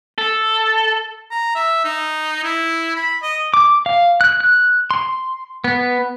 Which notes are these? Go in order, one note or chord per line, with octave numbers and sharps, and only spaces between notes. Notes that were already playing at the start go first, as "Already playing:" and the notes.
A4
A#5
E5
D#4
E4
B5
D#5
D6
F5
F#6
F#6
C6
B3